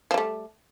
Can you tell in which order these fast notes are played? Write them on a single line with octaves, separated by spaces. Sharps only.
F3 G3 A3